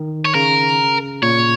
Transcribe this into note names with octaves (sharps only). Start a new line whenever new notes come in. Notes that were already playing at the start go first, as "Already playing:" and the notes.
Already playing: D#3
C#5
C#3 A#4
A#2 C#5